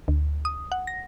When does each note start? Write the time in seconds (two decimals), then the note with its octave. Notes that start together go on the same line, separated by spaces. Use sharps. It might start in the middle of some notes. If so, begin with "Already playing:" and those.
0.08 D2
0.45 D#6
0.72 F#5
0.87 A#6